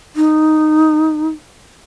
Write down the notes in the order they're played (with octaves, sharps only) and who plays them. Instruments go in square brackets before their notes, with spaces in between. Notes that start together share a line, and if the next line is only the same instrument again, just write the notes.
[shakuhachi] D#4